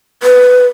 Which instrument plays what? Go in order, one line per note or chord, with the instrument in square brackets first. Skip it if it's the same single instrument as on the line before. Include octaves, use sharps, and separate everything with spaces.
[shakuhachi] B4